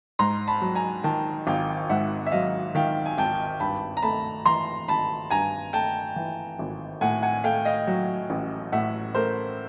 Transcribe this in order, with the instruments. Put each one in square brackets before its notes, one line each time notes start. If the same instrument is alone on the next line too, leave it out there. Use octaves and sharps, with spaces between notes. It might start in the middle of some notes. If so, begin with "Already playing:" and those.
[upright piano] G#2 [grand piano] A#5 C6
[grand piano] A5 B5
[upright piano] F#3
[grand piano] G#5 A#5
[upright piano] D#3 [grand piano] G5 A5
[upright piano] G#1 [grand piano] F5 G5
[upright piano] G#2 [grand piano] E5 F#5
[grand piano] E5
[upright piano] F#3 [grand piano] D#5 F5
[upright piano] D#3 [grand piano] F5 G5
[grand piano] G#5
[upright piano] G#1 [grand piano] G5 A5
[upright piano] G2 [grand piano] A5 B5
[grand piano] A#5
[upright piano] A3 [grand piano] A5 B5
[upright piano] E3 [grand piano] A#5 C6
[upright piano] G#1 [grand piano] A5 B5
[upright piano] G2 [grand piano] G#5 A#5
[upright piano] A3 [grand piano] G5 A5
[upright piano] E3
G#1
[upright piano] A2 [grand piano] F#5 G#5
[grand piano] F#5 G#5
[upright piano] A3 [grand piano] F5 G5
[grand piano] D#5 F5
[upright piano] F#3
A1
[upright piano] A2 [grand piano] E5 F#5
[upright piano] A3 [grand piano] A#4 C5